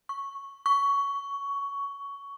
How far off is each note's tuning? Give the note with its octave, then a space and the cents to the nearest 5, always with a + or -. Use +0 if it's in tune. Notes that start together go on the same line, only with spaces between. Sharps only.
C#6 -5
C#6 +15